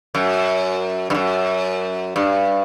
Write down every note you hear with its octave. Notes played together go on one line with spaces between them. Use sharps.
F#2
G2
F#2
G2